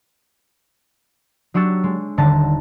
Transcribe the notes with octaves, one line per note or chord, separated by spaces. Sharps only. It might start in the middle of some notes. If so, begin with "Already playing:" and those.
F#3 D4 G4 C#6 E6 A6
G#3
D#1 D3 A5 A#5